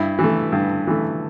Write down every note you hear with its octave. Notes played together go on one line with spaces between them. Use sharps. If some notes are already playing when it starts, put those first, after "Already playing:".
Already playing: G2 E4
E3
A3
G2
E3 A3